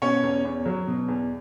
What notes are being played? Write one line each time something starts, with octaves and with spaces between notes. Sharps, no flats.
B2 C#4 C#5
E2
E2
F#3
B2
E2